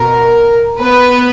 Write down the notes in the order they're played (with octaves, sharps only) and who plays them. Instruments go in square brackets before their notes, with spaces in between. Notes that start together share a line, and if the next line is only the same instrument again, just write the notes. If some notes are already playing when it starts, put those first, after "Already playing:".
Already playing: [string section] B2 A#4
B3 B4